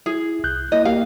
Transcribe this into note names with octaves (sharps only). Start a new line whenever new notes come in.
E4 G#4
C2 F#6 G6
A#3 E4 D#5
A#3 G4 F5